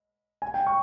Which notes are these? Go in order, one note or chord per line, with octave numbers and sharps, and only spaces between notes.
G#5
G5
C#6